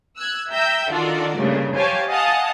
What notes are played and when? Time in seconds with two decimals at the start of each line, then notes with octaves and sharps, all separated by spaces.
0.17 E6 F#6 G#6
0.51 E5 G5 A#5 E6 G6
0.91 D#3 D4 F4 F#4 A4 D5
1.39 G2 A#2 C#3 A3 D4
1.76 G4 C5 C#5 F5 G#5 A5
2.09 D#5 F5 F#5 G#5 A5 D#6